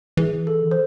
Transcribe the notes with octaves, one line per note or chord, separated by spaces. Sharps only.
E3 G#4
A4
D#3
E3 C5